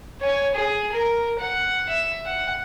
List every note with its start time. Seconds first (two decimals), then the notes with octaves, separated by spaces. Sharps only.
0.21 C#5 G#5
0.55 G#4
0.92 A#4
1.39 F#5
1.89 E5
2.26 F#5